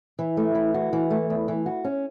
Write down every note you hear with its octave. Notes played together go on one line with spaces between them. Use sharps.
E3
A3
E3
F#4
E3
A3
E2
E3
F#4
C#4